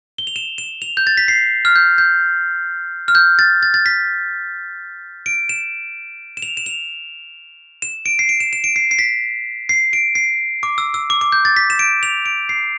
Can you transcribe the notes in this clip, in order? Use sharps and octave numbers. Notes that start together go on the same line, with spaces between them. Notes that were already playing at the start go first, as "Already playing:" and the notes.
G7
F7
E7
E7
F7
G6
A6
B6
C7
F6
G6
G6
F6
G6
A6
A6
A6
B6
D7
E7
E7
F7
E7
F7
E7
D7
C7
D7
E7
E7
D7
C7
C7
B6
C7
D7
C7
D6
E6
E6
D6
D6
G6
A6
B6
E7
D7
F7
D7
C7